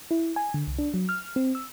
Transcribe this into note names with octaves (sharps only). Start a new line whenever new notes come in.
E4
G#5
D3
C2
D4
F#3
F6
C4
E6